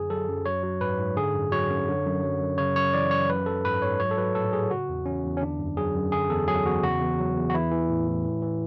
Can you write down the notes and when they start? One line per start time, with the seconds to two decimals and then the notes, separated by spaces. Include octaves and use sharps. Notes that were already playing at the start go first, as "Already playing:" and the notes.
Already playing: F#2 D3 G#4
0.10 F#3 A4
0.28 F#2
0.46 F#3 C#5
0.63 F#3
0.81 G#2 B4
0.99 G#2
1.16 D3 G#4
1.34 F#2
1.52 F#3 C#5
1.70 F#2
1.88 D3
2.05 F#2
2.23 F#3
2.40 F#2
2.58 C#3 C#5
2.76 F#2 C#5
2.93 E3 D5
3.11 F#2 C#5
3.29 F#3 B4
3.46 F#3 A4
3.65 G#2 B4
3.82 G#2 C#5
4.00 F#3 C#5
4.11 A4
4.17 F#3 B4
4.35 A2 A4
4.53 A2 G#4
4.71 C#3 F#4
4.89 E2
5.06 E3 C#4
5.24 E2
5.37 C#4
5.41 D3 D4
5.59 F#2
5.77 F#3 G#4
5.95 F#2
6.12 D3 G#4
6.30 E2 A4
6.48 F#3 G#4
6.66 E2 F#4
6.83 C#3 F#4
7.01 E2
7.19 F#3
7.37 E2
7.50 F#4
7.54 E3 E4
7.71 E3
7.90 A2
8.08 A2
8.24 E3
8.42 E3